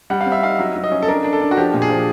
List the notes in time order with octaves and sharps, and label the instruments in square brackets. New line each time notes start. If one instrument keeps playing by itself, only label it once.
[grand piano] G3 F#5
F5
C4
E5
D#4 F5
F#3 E5
F#3
D#5
C#4
A4
D4 A#4
D4
A4
D4
F#4
F3 G4
A#2
G#4
F3